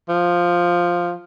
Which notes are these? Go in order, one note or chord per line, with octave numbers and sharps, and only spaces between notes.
F3